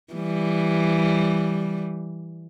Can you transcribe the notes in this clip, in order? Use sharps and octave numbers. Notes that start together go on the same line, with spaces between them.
E3 G3